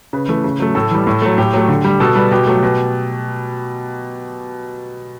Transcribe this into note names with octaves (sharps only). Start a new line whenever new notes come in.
C#3 B4
E3 A3
C#3
F#3 A3
A2 A4
E3 G3
A2
F#3 A3
A2 G4
F#3 A3
D3
G3
B2 A4
G3 B4
B2 G4
F#3 A3
B2